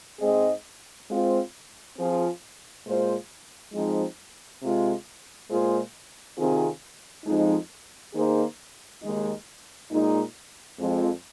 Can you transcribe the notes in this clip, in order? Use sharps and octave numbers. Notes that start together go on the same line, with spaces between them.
G#2 G#3 C4 G#4 D#5
G#3 C4 F4 C5
F3 C4 F4 G#4
A#2 G#3 F4 C5
F3 G#3 C4 D#4
C3 G#3 F4
A#2 G#3 F4 G#4 C5
C3 D#3 C4 F4 G#4
F2 F3 G#3 D#4
D#3 A#3 D#4 G#4 C5
D#2 D#3 G#3 D#4
A#2 G#3 D#4
F2 F3 G#3 C4 F4